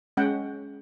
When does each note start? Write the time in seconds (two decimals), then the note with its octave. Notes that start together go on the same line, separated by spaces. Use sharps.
0.17 G#3 C#4 F#5 G5